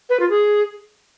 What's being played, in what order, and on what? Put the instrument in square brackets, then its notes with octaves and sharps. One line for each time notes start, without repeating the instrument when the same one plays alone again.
[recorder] B4
F4
G#4